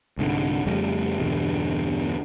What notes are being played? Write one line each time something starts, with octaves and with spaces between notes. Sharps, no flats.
C2 G#2 D3
F2 C#3 G3 A3
E2 G2 B2 D3